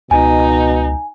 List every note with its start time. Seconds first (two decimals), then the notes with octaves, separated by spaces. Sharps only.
0.11 C#2 B2 D#4 G#5